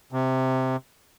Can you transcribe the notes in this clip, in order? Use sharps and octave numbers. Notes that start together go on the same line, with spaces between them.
C3